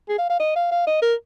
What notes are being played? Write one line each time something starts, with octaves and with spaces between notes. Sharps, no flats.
G#4
F5
F5
D#5
F5
F5
D#5
A#4